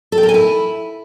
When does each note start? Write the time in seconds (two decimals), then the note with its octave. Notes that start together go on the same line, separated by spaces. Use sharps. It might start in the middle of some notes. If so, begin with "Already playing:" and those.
0.12 A4
0.18 G5
0.23 A#4
0.29 G#5
0.34 E4